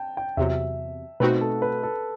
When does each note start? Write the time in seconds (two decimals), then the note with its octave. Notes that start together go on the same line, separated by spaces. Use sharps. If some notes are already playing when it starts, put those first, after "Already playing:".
Already playing: G5 A5
0.17 G5
0.37 E2 C3 F#3 E5
1.20 B2 A3 C4 D#4 F#4 B4
1.41 A4
1.62 B4
1.83 A4